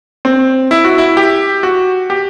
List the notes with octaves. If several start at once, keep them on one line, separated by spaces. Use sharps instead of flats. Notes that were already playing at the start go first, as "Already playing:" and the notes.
C4
E4
F#4
E4
G4
F#4
G4